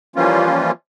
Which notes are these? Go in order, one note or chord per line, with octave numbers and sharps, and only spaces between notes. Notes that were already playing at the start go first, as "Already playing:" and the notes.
E3 F3 G3 A#3 C#4 F4